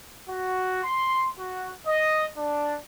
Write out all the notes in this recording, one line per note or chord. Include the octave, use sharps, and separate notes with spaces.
F#4
C6
F#4
D#5
D4